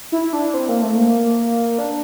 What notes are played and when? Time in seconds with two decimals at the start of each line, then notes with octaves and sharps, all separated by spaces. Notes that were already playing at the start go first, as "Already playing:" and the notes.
0.12 E4
0.33 D4
0.54 C4
0.69 A#3
0.82 A3
0.95 A#3
1.78 D4